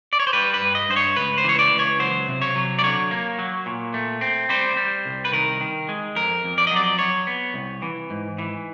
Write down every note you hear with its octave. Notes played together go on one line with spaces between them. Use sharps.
D5
C#5
C5
G3 B4
B4
G2
D#5
G2 C5
C#5
C#2 B4
C5
E3 C#5
D5
C#2
C#5
F#3 C5
C3
C#5
F#3
D5
D3 C#5
A#3
F#3
A#2
A3
C4
G3 C5
G3
C2
B4
D#3 A#4
D#3
G#3
F2 A#4
F2
D5
D#5
F#3 D5
F#3 C#5
B3
C2
E3
G#2
E3